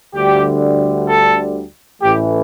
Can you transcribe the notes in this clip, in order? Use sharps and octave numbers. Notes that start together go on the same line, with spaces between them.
D2 D3 G3 G4
A4
A1 A2 E3 A3 G4